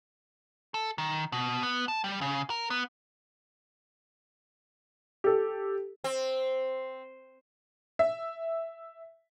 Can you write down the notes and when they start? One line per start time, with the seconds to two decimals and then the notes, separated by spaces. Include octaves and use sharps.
0.74 A4
0.98 D#3
1.32 B2
1.63 B3
1.88 A5
2.04 G3
2.21 C#3
2.50 A#4
2.70 B3
5.24 G4 A4
6.04 C4
7.99 E5